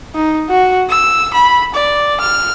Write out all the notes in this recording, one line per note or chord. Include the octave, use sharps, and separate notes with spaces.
D#4
F#4
E6
B5
D5
F6